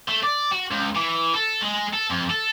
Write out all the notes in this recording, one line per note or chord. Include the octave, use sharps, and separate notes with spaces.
A3
D5
F#4
C#2
E3
A4
G#3
A4
F2
A4